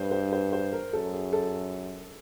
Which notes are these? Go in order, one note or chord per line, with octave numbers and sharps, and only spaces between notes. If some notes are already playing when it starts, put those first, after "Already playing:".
Already playing: G2 B4 C5
C5
C5
C5
A#4
F#2 A4
G#4
A4